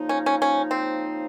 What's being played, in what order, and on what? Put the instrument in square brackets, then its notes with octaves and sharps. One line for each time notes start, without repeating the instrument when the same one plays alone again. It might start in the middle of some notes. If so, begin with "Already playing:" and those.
Already playing: [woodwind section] C#3 F3 A#3 D#4
[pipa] C#4
C#4
C#4
C4